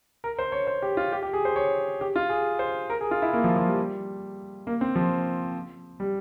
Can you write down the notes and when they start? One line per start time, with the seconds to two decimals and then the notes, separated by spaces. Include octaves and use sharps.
0.24 A#4
0.39 C5
0.52 C#5
0.67 C5
0.82 G4
0.97 F4
1.12 G4
1.23 G4
1.33 G#4
1.45 C5
1.56 C#5
2.01 G4
2.16 F4
2.29 G#4
2.59 C5
2.90 A#4
3.01 G#4
3.11 F4
3.22 E4
3.33 A#3
3.44 F3
3.56 F3
3.67 G3
4.67 A#3
4.81 C4
4.96 F3
6.00 G3